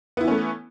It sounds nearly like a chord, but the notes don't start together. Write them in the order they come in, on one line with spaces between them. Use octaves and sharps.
B3 E4 E3 C#4 A3